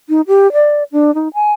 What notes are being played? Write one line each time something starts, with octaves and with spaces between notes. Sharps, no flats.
D#4
G4
D5
D4
D#4
G#5